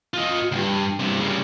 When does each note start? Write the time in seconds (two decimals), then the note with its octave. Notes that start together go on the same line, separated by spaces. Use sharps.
0.14 F4 D#5
0.52 D2 G2
1.00 G2 C3
1.20 C#3 G3